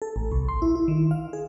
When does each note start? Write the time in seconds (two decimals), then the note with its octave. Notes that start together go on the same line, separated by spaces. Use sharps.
0.02 A4
0.16 A1
0.32 C2
0.48 C6
0.62 E4
0.75 E4
0.88 D#3
1.11 F5
1.33 G#4